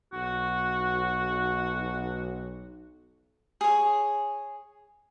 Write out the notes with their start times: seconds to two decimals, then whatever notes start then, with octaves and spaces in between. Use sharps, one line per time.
0.13 B1 F#4
3.61 G#4 C#5